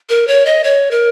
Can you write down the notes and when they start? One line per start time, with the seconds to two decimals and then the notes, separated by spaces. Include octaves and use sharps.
0.09 A#4
0.28 C#5
0.46 D#5
0.64 C#5
0.91 A#4